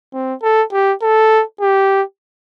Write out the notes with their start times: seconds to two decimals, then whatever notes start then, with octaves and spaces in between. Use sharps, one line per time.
0.13 C4
0.43 A4
0.73 G4
1.02 A4
1.61 G4